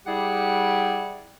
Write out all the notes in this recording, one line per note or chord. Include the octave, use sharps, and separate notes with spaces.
G3 E4 G4 G#4 D5 F#5